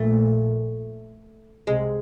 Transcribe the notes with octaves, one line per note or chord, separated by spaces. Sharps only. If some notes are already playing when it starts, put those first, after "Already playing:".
Already playing: A#1 A#2 A3
C2 C3 G#3